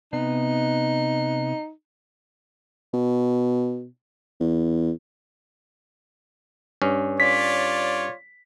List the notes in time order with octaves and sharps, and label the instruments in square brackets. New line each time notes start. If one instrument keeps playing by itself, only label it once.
[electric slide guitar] C3 B3 [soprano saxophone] D#4
[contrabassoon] B2
E2
[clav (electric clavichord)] G2 C#4
[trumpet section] F4 C#5 D5 [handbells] B6